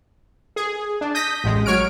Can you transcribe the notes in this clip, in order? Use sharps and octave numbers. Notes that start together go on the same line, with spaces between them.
G#4
D4
D#6 G6 A#6 B6
A1 G#3
F#3 C#5 F6 D7